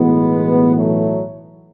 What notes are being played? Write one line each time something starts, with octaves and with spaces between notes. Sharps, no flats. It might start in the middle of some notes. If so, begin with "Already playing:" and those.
Already playing: B1 A2 E3 G#3 B3
F#3 A3